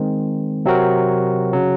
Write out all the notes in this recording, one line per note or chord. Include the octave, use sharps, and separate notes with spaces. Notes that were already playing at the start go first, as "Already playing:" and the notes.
Already playing: D#3 G#3 C4
C3 F#3 C4 F#4 A#4
C#3 F#3